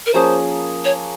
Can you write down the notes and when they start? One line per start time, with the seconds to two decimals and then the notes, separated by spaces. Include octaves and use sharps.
0.06 A#4
0.14 F3 A#3 C#4 G#4 C5
0.85 C#5